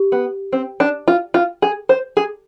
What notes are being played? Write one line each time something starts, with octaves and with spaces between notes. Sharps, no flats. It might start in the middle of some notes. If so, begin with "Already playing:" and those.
Already playing: G4
B3
C4
D4
F4
F4
G#4
C5
G#4